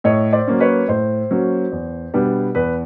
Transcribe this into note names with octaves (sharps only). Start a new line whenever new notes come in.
A2 C#5 D#5
C5 D5
F#3 A#3 C#4
B4 C#5
A2 C5
F#3 A#3 C#4
E2
B2 G3 B3 D4
E2 B4